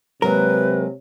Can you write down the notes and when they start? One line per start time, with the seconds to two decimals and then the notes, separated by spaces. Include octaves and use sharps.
0.22 C3 F#3 G#3 A#3 A#4 B4